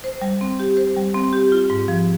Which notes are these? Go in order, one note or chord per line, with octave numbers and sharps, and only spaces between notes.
C5
G3
C4
G4
C5
G3
C4
G4
F4
G#2
F3